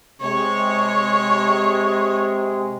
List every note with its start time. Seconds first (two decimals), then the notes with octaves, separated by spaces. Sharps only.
0.22 C3 G#3 C#5